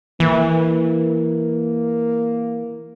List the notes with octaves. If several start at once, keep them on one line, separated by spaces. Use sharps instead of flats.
E3 A#3